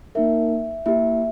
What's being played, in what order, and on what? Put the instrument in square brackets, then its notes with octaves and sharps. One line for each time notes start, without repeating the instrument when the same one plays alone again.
[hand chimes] A#3 D#4 A#4 [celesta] E5
[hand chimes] A#3 E4 G4 [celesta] E5